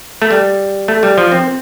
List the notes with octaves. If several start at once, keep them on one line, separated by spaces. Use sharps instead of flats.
A3
G3
A3
G3
F3
C4